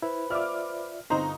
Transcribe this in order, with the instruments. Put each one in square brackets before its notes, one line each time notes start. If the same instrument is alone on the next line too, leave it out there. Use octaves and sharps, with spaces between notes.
[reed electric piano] E4 [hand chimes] B4 C5 B5
[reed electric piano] F4 D5 E5 [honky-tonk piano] D6 F6
[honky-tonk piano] G1 D#4 A#5 [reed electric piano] C4 C5